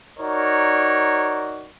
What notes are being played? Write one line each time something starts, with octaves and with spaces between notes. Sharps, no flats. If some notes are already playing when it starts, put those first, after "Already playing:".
D#4 F#4 A#4 C#5 D5